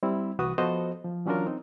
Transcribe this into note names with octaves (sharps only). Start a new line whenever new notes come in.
G3 C4 E4
C2 E3 F#4 B4 D#6
F3 B3 F#4 A4 C5 D#5
F3
E3 F#3 C#4 D4 F4 A#4
C4 D#4